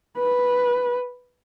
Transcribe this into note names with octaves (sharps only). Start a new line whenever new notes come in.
B4